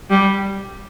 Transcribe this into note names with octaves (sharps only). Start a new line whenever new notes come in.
G3